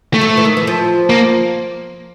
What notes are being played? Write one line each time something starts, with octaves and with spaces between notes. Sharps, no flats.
A3
F#3
F3
E3
D#3
E3
F3
A#3